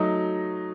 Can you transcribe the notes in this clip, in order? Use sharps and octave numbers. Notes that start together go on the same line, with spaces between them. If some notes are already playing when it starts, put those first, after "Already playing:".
Already playing: F#3 A3 D#4